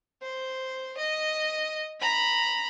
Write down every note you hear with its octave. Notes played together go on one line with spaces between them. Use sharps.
C5
D#5
A#5 B5